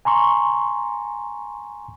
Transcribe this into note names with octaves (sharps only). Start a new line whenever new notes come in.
G#5 A#5 C6 C#6